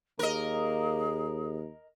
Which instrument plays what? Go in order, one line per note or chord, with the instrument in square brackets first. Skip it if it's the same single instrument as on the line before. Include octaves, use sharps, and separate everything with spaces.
[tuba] D#2 [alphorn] A#3 [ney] G#4 [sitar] A#4 D#5